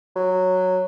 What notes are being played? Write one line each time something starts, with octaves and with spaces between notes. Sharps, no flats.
F#3